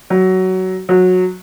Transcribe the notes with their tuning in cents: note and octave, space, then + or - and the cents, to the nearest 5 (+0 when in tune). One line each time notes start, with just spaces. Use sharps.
F#3 +15
F#3 -15